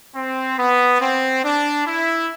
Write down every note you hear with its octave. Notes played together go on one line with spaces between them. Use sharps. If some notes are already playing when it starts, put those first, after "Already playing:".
C4
B3
C4
D4
E4